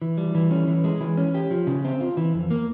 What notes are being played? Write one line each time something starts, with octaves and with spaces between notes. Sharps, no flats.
E3
G3
E3
C#4
E3
G#3
E3
C#4
G4
F3
C#3
C4
F4
E3
F2
A#3